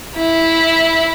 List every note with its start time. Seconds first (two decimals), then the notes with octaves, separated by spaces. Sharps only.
0.16 E4